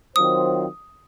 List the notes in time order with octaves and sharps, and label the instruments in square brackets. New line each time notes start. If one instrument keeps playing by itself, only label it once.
[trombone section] D#3 F#3 C4 F4 C5 [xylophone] D#6